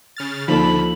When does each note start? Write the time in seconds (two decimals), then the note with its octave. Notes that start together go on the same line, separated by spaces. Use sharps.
0.17 C#3 F6 A6
0.48 D2 D3 F3 A#3 D#4 A4 B5